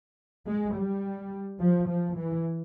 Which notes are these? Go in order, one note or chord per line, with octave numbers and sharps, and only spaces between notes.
G#3
G3
F3
F3
E3